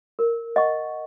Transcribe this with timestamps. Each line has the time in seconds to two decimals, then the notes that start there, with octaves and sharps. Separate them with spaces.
0.19 A#4
0.56 D#5 F#5 C#6